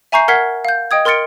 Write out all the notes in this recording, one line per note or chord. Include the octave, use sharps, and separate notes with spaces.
E5 G#5 A#5 C#6 G6 C7
A#4 F#5 F6 G#6 B6 C7
F5 G6
D#5 G5 D#6 G#6
A#4 C6 F6 A6 C#7 D7